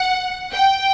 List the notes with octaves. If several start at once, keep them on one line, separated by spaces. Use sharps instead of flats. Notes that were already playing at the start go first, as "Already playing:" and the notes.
Already playing: F#5
G5